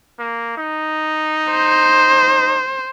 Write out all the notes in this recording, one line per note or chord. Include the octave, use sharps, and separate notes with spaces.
A#3
D#4
C5